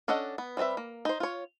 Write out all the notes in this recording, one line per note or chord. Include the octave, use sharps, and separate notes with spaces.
C#4 D4 A4 D#5 F#5
B3
G3 C4 F4 B4 E5
A#3
D#4 C5
F4 C#5